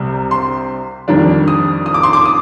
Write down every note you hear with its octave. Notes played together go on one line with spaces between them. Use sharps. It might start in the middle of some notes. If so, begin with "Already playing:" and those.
Already playing: C2 C3 G3
C6
F2 D#3 G3 D4
D#6
D#6
D6
C6
D6
D#6